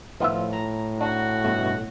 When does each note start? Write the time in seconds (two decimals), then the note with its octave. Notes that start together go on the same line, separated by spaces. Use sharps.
0.20 A2 D#3 F3 B3 F4 E5
0.53 A#5
1.01 D4 F#4
1.44 G2 B2 A3